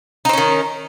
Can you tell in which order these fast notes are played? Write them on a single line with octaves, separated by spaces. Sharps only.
D#4 C4 C#4 D#3